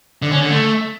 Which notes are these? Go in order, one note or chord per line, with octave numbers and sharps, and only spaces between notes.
D3
C#4
D3
A3